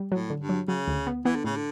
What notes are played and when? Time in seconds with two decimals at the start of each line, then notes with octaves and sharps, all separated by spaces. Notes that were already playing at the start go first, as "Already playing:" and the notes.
Already playing: G3
0.12 A2 F#3
0.30 D3
0.40 G2
0.49 F#3
0.68 C#3 F#3
0.88 D2
1.07 B3
1.25 E3 B3
1.35 D3
1.44 A2 C#3
1.56 D3